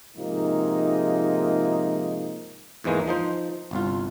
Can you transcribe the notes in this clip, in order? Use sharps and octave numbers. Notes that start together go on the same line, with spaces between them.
G#2 C3 F3 G#3 A#3 D#4
E2 G#2 E3 G#3 A#3
F3 D#4 C5
G1 C2 F4